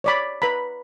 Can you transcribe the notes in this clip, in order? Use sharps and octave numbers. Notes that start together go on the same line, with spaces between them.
C#5 D5 B5
B4 A#5 B5